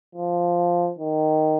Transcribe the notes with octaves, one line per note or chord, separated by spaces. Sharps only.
F3
D#3